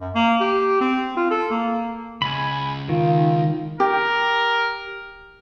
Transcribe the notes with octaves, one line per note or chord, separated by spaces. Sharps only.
F#2
A#3
G4
C4
F4
A4
A#3
C#2 G#5 B5
D#3 F4
G4 A#4